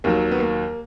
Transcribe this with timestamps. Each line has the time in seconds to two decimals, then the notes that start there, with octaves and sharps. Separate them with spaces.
0.04 D#2 D#3 F#3 A#3
0.31 B3
0.40 A#3